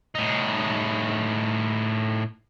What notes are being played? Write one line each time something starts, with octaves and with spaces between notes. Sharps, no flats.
A2 D#4